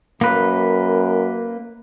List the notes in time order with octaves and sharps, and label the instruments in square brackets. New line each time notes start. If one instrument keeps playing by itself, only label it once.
[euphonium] F#2 [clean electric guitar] A#3 B4